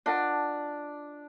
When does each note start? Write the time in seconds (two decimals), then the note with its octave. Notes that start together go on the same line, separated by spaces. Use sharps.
0.06 D4 F4 A#4 D#5 F#5